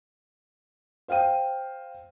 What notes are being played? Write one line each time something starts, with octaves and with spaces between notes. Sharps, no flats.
C5 F5 G5 D#7